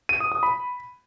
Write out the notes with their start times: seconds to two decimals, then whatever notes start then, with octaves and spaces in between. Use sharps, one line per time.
0.09 D#7
0.20 D#6
0.32 D#6
0.43 B5